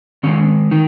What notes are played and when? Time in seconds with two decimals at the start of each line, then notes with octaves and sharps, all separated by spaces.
0.23 D#3 G#3 C#4
0.71 D#3 D#4